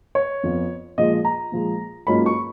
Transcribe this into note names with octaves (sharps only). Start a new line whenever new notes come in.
C#5
F2 F3 B3 F4
A#2 F3 G#3 D#5
A#5
A#2 F3 G#3
G#2 F#3 A#3 C#4 F4 B5
C#6